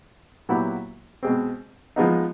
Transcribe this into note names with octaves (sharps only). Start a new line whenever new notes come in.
A#2 F#3 B3 E4 G4
B2 G#3 C4
F3 G#3 B3 D#4